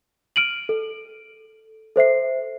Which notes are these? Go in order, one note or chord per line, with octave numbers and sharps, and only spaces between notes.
F6 D7 D#7 F#7
A4
A4 C5 E5 C7